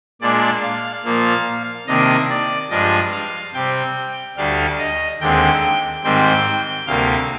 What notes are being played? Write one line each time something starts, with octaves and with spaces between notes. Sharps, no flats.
A#2 G#3 D4 D5
F5
A#2 F3 A#3 F5
C3 D#3 A#3 D4 D#5
D5
G2 F3 G#3 D4 D#5
F5
C3 G3 C4 G5
D2 D3 G3 D4 F5
D#5
D#2 D3 G#3 C4 G5
G#2 D#3 G3 C4 G5
D2 C3 G3 A#3 F5